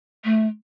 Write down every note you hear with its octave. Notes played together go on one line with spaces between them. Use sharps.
A3